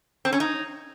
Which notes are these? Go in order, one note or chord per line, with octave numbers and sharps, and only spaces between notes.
C4
C#4
D#4